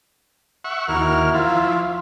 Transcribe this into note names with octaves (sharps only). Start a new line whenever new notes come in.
E5 F#5 C#6
D#2 E4 F#4 A#4 F6
F3 E4 F4